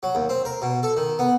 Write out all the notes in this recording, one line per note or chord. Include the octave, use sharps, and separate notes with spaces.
F#3
D#2
C4
A#4
B2
A4
D#3
B3